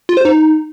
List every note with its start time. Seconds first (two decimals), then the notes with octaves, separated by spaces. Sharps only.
0.09 F4
0.17 C5
0.25 D#4